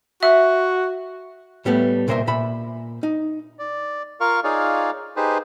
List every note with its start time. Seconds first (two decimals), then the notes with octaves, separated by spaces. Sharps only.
0.23 F#4 E5
1.65 A2 G3 A3 B3
2.08 C2 A#2 A#4 C5 D#5 E5
2.27 A#2 E5 B5
3.03 D#4
3.59 D5
4.20 F4 A#4 F5 C#6
4.44 D#4 F4 G#4 C#5 D5 F5
5.16 D#4 G4 G#4 B4 C5